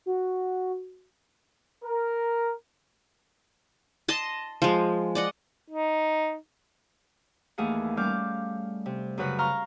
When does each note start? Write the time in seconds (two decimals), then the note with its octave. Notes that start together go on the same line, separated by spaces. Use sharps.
0.06 F#4
1.84 A#4
4.08 D#5 A5 C6
4.62 F3 G#3
5.15 D5 D#5 F#5
5.70 D#4
7.58 D#2 E3 A3 G#4 F5 F#5
7.97 G3 C#4 F5 D6 F6 G6
8.86 C3
9.18 F#2 C#3 F#3 B4 F#5 F#6
9.38 F5 A#5 C6 C#6 F6